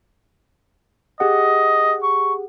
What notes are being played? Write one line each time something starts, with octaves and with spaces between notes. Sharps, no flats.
G4 G#4 D#5 F#5
C#6